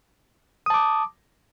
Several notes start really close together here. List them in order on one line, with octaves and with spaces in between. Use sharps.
D#6 A5 D6